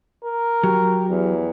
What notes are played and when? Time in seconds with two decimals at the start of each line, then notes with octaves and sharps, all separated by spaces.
0.25 A#4
0.63 F#3 G4
1.10 E2